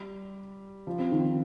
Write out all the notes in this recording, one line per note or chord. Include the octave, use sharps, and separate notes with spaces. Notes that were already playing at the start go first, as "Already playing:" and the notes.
Already playing: G3
F3
C4
D#3